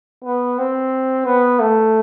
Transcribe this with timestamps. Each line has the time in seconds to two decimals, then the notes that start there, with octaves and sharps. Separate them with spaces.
0.24 B3
0.59 C4
1.26 B3
1.60 A3